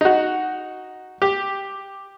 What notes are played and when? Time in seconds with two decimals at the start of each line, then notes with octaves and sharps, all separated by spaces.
0.01 D#4 F#4
1.22 G4